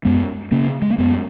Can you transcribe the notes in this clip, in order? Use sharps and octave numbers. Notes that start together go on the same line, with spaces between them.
F#2 G#3 B3
C#3 A#3 C#4
G#3
A#3
F#2 G#3 B3